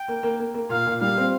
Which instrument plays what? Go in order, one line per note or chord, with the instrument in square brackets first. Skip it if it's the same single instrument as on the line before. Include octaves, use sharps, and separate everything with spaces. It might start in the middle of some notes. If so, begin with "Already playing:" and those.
Already playing: [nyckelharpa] G5
[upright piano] A#3
A#3
A#3
A#3
[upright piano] A#2 [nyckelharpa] F5
[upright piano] A#2
[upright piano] G3 [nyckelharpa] F5
[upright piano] C4